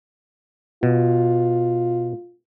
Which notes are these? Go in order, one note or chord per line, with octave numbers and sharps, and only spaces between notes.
B2 F4